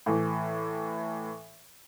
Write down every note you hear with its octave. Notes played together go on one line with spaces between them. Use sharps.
A2 E3